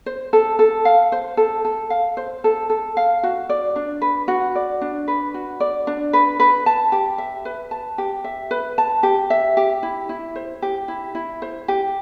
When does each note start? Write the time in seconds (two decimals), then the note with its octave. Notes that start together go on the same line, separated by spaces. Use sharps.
0.06 C5
0.33 A4
0.59 A4
0.85 F5
1.12 C5
1.37 A4
1.65 A4
1.90 F5
2.17 C5
2.44 A4
2.70 A4
2.97 F5
3.23 F#4
3.49 D5
3.76 D4
4.02 B4
4.28 F#4
4.55 D5
4.81 D4
5.08 B4
5.34 F#4
5.60 D5
5.87 D4
6.13 B4
6.40 B4
6.66 A5
6.92 G4
7.18 E5
7.45 B4
7.71 A5
7.98 G4
8.24 E5
8.51 B4
8.78 A5
9.03 G4
9.30 E5
9.57 G4
9.83 E4
10.09 E4
10.36 C5
10.62 G4
10.88 E4
11.15 E4
11.42 C5
11.68 G4